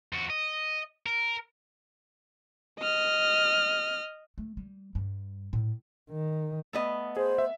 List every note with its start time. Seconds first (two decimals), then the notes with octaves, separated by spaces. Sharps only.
0.13 F2 F#4
0.30 D#5
1.06 A#4
2.80 D#5 F6
4.38 A3
4.57 G3
4.95 G2
5.53 A2
6.10 D#3
6.73 A3 B3 D#5
7.17 G#4 C5
7.38 E5